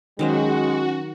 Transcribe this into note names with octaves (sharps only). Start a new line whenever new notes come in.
D#3 F#3 G#3 C#4 F#4 C5